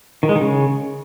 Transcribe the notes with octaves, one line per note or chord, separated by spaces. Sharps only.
D#3
G#3
D#3
C#3